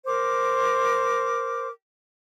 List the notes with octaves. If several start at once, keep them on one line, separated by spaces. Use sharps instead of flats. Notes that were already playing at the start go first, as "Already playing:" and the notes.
A#4 C5 D6